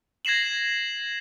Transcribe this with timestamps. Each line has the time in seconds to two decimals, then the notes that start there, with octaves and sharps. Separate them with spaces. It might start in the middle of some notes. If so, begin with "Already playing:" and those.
0.25 G#6 A#6 C7 E7 F#7